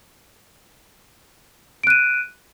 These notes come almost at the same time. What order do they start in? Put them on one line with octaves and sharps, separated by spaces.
D7 F#6 D#7